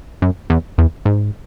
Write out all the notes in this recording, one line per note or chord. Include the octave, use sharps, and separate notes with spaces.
F#2
E2
E2
G#2